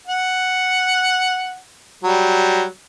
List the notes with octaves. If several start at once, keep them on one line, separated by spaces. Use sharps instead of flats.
F#5
F#3 G3